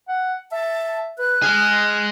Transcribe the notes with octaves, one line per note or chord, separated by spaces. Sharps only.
F#5
E5 A5
B4 F#6
G#3 G#4 F6